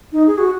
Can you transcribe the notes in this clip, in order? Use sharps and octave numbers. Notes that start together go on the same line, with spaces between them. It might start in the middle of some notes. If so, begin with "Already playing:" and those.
D#4
G#4
F#4